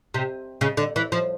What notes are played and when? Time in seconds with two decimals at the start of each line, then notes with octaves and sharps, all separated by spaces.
0.14 C3
0.61 C#3
0.77 D3
0.96 E3
1.12 F3